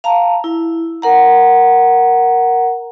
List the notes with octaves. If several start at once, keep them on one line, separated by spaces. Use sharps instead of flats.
F5 A5 A#5
E4
A#4 F#5 A#5